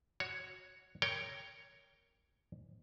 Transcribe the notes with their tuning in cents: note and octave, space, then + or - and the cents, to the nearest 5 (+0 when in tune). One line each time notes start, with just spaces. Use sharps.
F#4 +0 C#5 +0
A#4 +0 C#5 +10 G5 +0